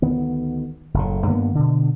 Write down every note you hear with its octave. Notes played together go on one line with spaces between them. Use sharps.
D2 D#3 B3
F#1 A2
G2 D#3 A#3 B3
B2 D3